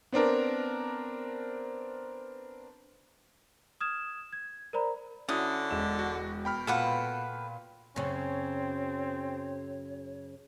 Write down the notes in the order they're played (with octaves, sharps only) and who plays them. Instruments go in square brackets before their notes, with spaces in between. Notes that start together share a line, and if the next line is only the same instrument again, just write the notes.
[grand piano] B3 C4 D4 A#4
[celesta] D#6 F6 G#6 E7
G#6
A#4 C5 D5 A#5 B5
[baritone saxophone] D3 [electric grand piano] C#4 E4 F#4 [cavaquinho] D#6
[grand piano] E1 G#3 E7
[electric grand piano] F#4
[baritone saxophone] B2 [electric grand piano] G5 B5 F6
[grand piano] A#2 F4 [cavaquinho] A4 B4 F#5
[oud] F#2 C#3 [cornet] C4 [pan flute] C#5